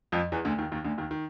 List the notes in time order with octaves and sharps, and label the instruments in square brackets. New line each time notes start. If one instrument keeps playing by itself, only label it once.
[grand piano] F2 F3
E2 E3
D2 D3
D#2 D#3
D#2 D#3
D2 D3
D#2 D#3
D#3